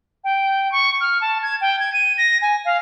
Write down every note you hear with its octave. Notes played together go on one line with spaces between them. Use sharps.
G5
C#6
F6
A5
G#6
G5
G#6
D#7
A#6
G#5
F5